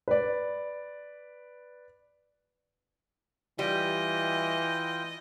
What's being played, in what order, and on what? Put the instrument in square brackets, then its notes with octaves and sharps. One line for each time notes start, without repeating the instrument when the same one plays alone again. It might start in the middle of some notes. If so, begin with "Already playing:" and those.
[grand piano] B4 D5
[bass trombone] E3 [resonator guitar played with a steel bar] G3 [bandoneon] F4 G5 [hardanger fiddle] D#5